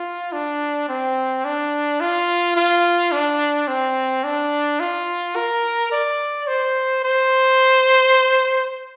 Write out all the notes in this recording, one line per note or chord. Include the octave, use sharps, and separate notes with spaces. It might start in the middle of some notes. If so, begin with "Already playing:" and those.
Already playing: F4
D4
C4
D4
F4
F4
D4
C4
D4
F4
A#4
D5
C5
C5